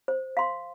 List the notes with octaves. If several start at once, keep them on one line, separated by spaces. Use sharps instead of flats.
C5
F5 C6